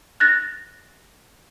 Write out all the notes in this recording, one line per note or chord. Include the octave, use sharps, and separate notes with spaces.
F#6 A6 A#6